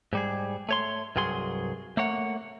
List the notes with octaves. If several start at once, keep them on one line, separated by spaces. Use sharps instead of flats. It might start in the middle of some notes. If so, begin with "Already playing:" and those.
G#2 G3 G#4
A3 C#5 C6
C2 G2 F#3 G#4 C6
A3 A#3 C#5 F#5